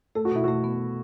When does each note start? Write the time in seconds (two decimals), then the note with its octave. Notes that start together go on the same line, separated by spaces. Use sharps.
0.15 A3 A4
0.25 F#4
0.32 B2 E4
0.44 A3 F#4
0.64 B3